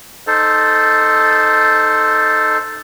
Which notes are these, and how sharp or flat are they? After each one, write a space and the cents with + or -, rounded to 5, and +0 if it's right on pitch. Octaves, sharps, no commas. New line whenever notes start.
D#4 -15 A4 +0 C5 +0